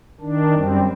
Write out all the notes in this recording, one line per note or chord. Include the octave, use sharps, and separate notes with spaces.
D#3 D4
F#2 G3 C4